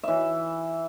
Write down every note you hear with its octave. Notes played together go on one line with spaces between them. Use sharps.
E3 E5